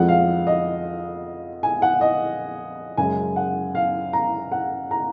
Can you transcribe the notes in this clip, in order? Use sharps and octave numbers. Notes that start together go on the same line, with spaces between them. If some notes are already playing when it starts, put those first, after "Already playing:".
Already playing: F2 F3 G#3 F#5
F5
D#5
G#5
F#5
D#5
F#2 C#3 G#3 G#5
F#5
F5
A#5
F#5
A#5